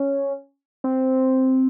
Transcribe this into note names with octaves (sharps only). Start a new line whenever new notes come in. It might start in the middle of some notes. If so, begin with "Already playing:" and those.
Already playing: C#4
C4